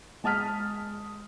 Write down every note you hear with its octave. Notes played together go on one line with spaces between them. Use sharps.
G#3 A5 D#6 F6 B6